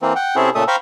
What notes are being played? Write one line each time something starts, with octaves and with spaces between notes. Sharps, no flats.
E3 A#3 C4
F#5 G5
C3 C4 C#4 E4 G#4 A4
A#2 C#3 A3 A4 E5 D#6
C5 F5 G5 A#5 B5 C#6